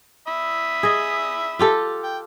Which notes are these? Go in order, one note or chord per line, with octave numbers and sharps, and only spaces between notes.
E5 B5 D#6
G#4 D#5
F4 G4 A4
G5